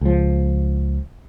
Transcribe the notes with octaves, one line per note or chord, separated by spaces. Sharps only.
C#2 F3